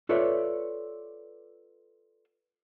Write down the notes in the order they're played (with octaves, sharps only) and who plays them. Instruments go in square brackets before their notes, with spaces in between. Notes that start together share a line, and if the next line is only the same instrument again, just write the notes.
[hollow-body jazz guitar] F4 A4 B4 C#5 D5 E5